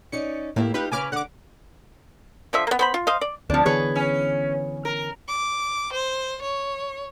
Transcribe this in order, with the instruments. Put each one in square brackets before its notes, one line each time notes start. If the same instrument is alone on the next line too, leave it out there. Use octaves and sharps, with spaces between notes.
[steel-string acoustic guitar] C#4 D#4 D5 [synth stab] C#7
[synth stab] A2 [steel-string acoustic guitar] A#3 E4 G4
[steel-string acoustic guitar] D#4 F4 G4 [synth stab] B4
[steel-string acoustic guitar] C#3 C#4 B4 [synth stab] G#5 D6 F6
[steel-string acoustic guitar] D3 [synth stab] F#5 D6
[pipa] D3 F3 E5
A#3 B3
B3 C5 B5
F4
C5 D#5 F5
D5
[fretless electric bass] D2 C4 [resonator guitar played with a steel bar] F3 D4
[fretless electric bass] D3 E3 B3 [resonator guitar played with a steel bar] G#4 B4 C#5
[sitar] C#4
A#4
[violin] D6
C5
C#5